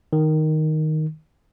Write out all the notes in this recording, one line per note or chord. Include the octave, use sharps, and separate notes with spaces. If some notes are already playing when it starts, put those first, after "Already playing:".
D#3